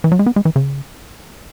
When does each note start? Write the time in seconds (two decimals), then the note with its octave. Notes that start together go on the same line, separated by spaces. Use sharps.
0.04 E3
0.12 F#3
0.19 G#3
0.26 B3
0.36 G#3
0.45 E3
0.56 C#3